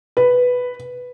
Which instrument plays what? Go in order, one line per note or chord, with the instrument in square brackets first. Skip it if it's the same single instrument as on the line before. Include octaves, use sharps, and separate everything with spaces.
[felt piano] B4